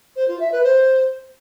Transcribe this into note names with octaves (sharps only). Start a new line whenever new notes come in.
C5
F4
E5
B4
C5